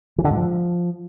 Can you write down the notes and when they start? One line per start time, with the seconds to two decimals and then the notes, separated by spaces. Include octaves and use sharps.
0.18 E3
0.24 D3
0.30 G#2
0.36 F3